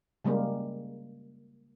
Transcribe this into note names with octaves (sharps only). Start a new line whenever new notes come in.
C#3 G3 G#3 A#3